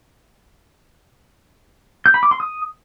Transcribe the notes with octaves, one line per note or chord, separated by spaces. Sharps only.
G6
B5
D6
C6
D#6